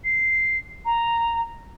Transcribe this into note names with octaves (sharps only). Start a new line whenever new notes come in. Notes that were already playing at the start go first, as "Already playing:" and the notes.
C7
A#5